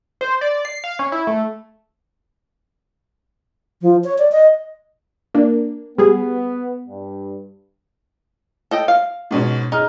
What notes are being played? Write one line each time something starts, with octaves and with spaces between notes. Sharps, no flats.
C5
D5
C7
F5
C#4
E4
A3
F3
C#5
D5
D#5
A#3 D4
G3 B3 G#4
G2
A4 D#5 G5
F5
G#2 B2 C#4
D#4 G#4 F6